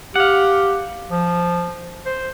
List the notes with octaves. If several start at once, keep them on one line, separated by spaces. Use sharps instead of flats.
G4 F5 F#5
F3
C5